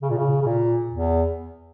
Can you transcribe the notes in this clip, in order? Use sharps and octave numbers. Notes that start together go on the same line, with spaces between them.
C#3
A#2
C#3
C#3
A#2
E2